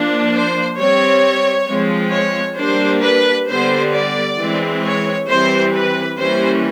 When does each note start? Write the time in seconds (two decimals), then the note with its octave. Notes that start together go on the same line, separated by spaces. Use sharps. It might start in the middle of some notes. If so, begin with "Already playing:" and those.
Already playing: F3 A#3 D4
0.32 C5
0.77 G3 C4 C#5
1.68 F3 G#3 C4
2.12 C#5
2.57 G3 A#3 D4 C5
3.03 B4
3.48 D3 G3 B3 C5
3.93 D5
4.38 E3 G#3 C4
4.83 C#5
5.28 E3 G3 C4 C5
5.74 B4
6.18 E3 G3 A#3 C#4 C5